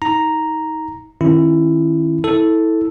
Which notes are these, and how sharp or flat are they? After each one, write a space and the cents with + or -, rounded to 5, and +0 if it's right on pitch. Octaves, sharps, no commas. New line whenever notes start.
D#4 +30 A#5 +0
D#3 +0 C#4 -40 E4 +15
E4 -20 A4 +0